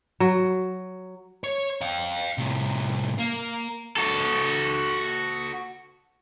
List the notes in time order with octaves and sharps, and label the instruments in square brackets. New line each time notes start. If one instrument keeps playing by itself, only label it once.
[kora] F#3
[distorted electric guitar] C#5
F5 G5
A2 C3
A#3
[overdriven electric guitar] F#4 A4